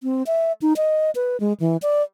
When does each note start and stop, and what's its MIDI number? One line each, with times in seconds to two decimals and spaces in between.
0.03 0.23 60
0.26 0.52 76
0.62 0.73 63
0.76 1.11 75
1.15 1.37 71
1.40 1.53 56
1.60 1.77 52
1.82 2.02 74